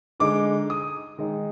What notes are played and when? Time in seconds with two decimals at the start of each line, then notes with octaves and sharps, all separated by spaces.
0.20 D3 G#3 D#4 D6
0.70 D#6
1.18 D#3 G#3 D#4